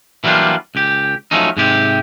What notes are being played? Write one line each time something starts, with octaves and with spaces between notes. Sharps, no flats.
E3 F#3 G3 A#3 D4 F4
C#2 G4
F3 F#3 A3 C#4 D#4
G#2 C3 G4